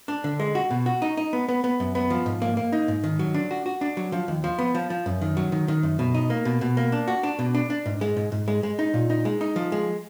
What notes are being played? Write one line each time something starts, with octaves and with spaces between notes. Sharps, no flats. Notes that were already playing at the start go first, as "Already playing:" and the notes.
D4
D3
G#3
F#4
B2
F#4
D#4
D#4
B3
B3
B3
F#2
B3
F3
G#2
A#3
A#3
D#4
G#2
D#3
F#3
D4
F#4
F#4
D4
F#3
F3
D#2
F3
B3
F3
F3
F#2
D#3
F#3
D#3
D#3
F#2
B2
D#4
A#3
B2
B2
A#3
D4
F#4
D4
B2
D4
D4
G#2
G#3
G#2
G#2
G#3
G#3
D#4
A#2
D#4
G#3
D#4
F3
G#3